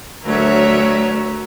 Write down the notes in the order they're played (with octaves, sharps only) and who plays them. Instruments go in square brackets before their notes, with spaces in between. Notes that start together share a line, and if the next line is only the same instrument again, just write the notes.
[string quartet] D2 F#3 E5 [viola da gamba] A#4 C#5